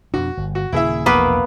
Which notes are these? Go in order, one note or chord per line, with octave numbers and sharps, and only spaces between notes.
F2 B2 D4 F#4
G1
F#4
D#1 C#3 A#3 E4 G#4 E5
E1 A#1 A#3 B3 B4